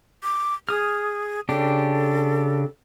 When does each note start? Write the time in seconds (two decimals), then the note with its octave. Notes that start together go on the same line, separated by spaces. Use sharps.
0.23 D6
0.69 G#4 D#6 F6
1.49 C#3 D4 G4 A4